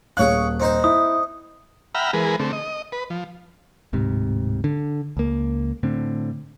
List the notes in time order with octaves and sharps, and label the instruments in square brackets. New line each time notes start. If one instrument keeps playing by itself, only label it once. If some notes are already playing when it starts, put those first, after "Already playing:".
[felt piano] D#1 F#6 [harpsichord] G#4 C#5 F5
[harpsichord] C4 D#4 C5
[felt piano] E4 [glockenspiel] D#6
[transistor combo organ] E5 F#5 G5 A#5 B5 F6
E3 G#3 G#4 A#4 B4
D3 A3 C4
D#5
B4
F3
[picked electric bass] D1 G#2 C3
D3
C#2 A#3
A2 D3 C4